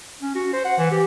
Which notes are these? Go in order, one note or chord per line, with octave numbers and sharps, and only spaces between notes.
C#4
F#4
C5
F#5
E3
G4